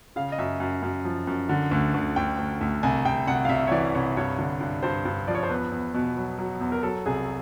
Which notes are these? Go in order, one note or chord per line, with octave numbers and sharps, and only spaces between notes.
C#3 F5
D#5
F#2 E5
F#2
F#2
F3
F#2
D3
D2
D2
D2 G5
D2
D2
C2 G#5
C2 G5
C2 F#5
F5
C2 E5
C#5
E3 D5
C2 C#5
G2 C#5
D3
G2
G2 C5
G2
F3 D5
C#5
C5
E2 B4
E2
B2
F#3
F#3
E2
A#4
F#3 A4
C2 G#4